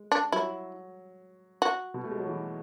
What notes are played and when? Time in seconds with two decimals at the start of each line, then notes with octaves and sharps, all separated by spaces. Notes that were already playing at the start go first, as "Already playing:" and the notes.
Already playing: G#3
0.12 D4
0.32 F#3 E4
1.62 F#4
1.94 B2
2.04 A3
2.12 G#3
2.19 F#3
2.27 E3